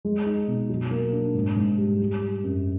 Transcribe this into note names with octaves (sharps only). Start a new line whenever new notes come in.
G#3
D#4
B2
F#3
A#3
D4
G#2
G#2
G3
G3
G3
F#2